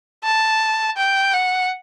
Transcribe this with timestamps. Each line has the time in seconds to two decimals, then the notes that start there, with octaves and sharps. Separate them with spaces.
0.24 A5
0.97 G5
1.33 F#5